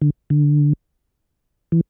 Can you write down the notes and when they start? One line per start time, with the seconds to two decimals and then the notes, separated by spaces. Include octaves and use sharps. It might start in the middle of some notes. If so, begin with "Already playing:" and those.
0.02 D3
0.30 D3
1.72 E3